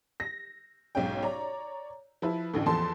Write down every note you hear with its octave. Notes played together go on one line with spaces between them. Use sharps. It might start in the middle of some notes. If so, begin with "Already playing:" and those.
A#6
B1 G#2 C#4 G5
C#5 D5 A#5
F3 E4 B4
A1 D2 A2
E2 F3 A4 A5 C6